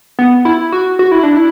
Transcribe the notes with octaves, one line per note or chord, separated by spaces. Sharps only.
B3
E4
F#4
F#4
E4
D4
E4